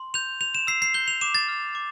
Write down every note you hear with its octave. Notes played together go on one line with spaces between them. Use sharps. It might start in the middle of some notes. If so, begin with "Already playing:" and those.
Already playing: C6
G6 F7
G6 F7
E7
E6 C7
C7
G6 G7
F7
D6 E7
A6
F6
D6